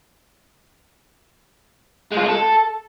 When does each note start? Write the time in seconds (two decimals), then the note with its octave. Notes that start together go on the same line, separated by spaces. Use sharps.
2.12 G#3
2.17 F4
2.23 G#3
2.29 A4